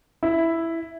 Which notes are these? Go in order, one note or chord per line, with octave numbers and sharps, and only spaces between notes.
E4